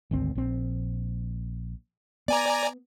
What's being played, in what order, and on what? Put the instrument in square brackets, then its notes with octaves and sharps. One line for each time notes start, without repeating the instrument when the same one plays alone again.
[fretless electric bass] G#1 D2 C4
A#1 C4
[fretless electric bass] B3 [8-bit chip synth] D5 G#5 A#5